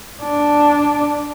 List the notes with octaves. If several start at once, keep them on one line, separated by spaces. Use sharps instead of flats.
D4